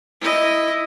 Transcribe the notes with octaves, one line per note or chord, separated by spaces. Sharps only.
E4 D#5